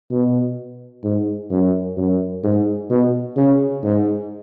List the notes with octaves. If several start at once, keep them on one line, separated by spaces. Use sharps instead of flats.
B2
G#2
F#2
F#2
G#2
B2
C#3
G#2